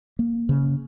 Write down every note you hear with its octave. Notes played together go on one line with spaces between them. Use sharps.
A#3
C#3